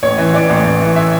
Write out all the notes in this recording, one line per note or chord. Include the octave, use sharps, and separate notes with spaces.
A1 C#5
E3
E3 D5
A1
A1
E3
E5